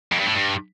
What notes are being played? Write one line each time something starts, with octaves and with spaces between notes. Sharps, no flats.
F2
G2
A2
G2